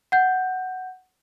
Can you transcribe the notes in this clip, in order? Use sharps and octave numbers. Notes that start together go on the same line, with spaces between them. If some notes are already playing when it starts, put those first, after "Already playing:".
F#5 G6